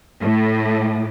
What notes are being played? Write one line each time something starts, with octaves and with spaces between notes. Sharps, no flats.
A2